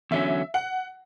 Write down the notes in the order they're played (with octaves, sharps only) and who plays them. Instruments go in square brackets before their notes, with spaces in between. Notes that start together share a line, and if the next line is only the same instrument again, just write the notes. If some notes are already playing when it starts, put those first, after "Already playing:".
[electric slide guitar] E2 D3 F#3 C#4 [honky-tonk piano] E5
[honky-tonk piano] F#5